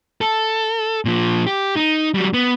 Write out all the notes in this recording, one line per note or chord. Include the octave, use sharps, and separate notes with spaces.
A4
A#2 F3
G4
D#4
F#3 G3
B3